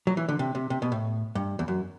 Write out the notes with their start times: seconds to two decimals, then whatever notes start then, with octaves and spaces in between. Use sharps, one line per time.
0.07 F#3
0.17 E3
0.28 D3
0.39 C3
0.55 C3
0.70 C3
0.82 B2
0.92 A2
1.35 G2
1.59 E2
1.68 F#2